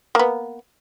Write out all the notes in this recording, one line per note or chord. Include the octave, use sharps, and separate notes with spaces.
A#3 B3